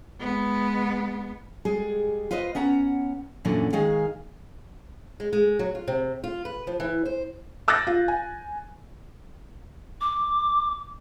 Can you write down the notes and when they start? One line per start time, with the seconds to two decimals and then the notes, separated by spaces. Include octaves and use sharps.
0.20 G#3 B3
1.65 G3 G#3 G#4
2.31 F4 B4 C5 D#5
2.55 B3 C#4 F#5 A#5
3.45 F#2 A#2 D3 E3 F#3
3.73 D#3 G#3 G#4 F5
5.20 G#3
5.33 G#3
5.59 F#3
5.75 F4
5.88 C3
6.24 F4
6.45 B4
6.67 F3
6.80 E3
7.05 C5
7.68 D6 E6 F#6 G6 A6 A#6
7.87 F4
8.08 G#5
10.01 D6